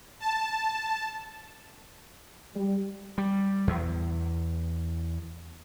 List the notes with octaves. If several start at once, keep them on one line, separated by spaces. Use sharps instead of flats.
A5
G3
G3
E2